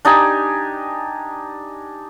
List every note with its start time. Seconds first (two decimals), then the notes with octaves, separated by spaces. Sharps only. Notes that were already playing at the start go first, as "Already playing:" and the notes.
0.05 D4 D#4 G4 G#5